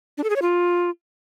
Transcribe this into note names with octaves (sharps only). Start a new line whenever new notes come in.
D4
A4
G#4
C#5
F4